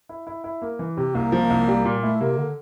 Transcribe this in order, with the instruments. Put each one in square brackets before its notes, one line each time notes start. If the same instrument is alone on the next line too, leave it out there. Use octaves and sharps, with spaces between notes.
[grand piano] E4
E4
E4
A#3
E3
[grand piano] C3 [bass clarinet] G4
[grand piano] C2 [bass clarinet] A#3
[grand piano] F3
C2
G3
A#2
[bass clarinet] A3 [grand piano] E4
[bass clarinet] C3 [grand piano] A#3
[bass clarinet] D3